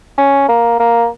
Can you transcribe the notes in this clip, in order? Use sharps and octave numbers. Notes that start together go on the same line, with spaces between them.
C#4
A#3
A#3